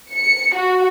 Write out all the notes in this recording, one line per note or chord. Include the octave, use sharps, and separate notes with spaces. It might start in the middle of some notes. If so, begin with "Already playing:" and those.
C#7
F#4